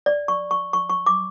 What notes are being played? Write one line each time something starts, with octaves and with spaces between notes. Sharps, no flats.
D5
C#6
C#6
C#6
C#6
D6